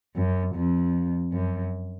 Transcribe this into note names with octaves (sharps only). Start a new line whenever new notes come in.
F#2
F2
F#2